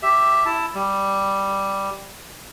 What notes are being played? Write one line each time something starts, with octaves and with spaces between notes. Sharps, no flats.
G4 E5
E4 A5
G3